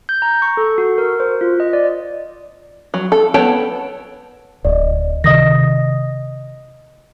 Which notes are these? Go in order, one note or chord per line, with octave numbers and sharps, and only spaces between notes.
G6
A#5
C#6
A4
F#4
A#4
C5
F4
D#5
D5
F#3
A4
B3 A4 C#5 G5 A5
D1 D5 D#5
C3 D#3 D#5 D#6 A#6